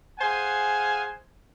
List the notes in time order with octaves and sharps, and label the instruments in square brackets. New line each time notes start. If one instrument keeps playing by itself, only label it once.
[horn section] G#4 C5 F5 F#5 G#5